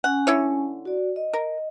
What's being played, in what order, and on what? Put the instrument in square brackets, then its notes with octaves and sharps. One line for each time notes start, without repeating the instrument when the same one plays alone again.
[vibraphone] C#4 G#5 [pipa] F#5
[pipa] D3 E4 C#5
[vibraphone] F#4 D5
D#5
[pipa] A#4